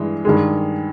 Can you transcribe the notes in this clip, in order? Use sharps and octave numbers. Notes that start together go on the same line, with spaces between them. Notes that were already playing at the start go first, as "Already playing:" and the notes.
Already playing: G2 E3 G#3
G2 D#3 G#3